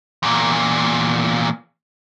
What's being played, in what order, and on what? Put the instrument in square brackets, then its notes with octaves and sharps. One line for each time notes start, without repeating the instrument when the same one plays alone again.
[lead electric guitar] E2 A#2